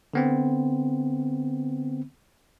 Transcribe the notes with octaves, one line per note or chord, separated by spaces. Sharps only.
D3 B3 C4